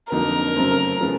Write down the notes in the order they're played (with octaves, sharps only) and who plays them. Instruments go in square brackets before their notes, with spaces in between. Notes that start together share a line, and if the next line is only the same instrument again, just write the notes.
[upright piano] F2 D3 F#3 A#3 D#4 [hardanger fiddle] A#4
[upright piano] F#2 C#3 F#3 A3 C4
C#3 F3 G#3 B3